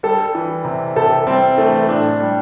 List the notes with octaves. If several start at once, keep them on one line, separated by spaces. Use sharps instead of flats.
G3 A4
E3
C3
C3 A4
G3 C4
E3 A3
A2 D4
G3